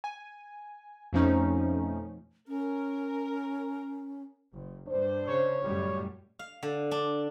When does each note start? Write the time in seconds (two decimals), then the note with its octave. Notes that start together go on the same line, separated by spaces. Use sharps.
0.04 G#5
1.13 F2 B2 F3 A3 C#4 D#4
2.48 C#4 A#4
4.54 F#1
4.88 G2 D4 C5
5.27 C#3 C#5
5.64 F#2 A2 G3
6.39 F5
6.63 D3
6.91 D4